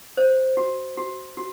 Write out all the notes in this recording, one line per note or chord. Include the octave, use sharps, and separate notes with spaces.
C5
F#4
F#4
F#4